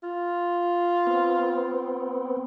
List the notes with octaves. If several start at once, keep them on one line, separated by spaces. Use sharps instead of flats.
F4
B3 C4